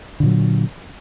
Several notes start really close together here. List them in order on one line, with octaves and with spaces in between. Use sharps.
D3 A#2 F#3